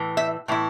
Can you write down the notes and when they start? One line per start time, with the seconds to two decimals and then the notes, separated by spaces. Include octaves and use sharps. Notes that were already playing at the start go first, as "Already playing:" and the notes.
Already playing: A2 E3
0.17 E5
0.48 A2 E3 E4